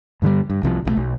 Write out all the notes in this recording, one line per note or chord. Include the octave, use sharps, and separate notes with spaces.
G2 D3 D#3 G3
G2
C2 C3 F3
B1 D#3 A3
B1